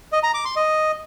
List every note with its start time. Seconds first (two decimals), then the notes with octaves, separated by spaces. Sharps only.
0.12 D#5
0.23 A#5
0.34 D6
0.45 C6
0.56 D#5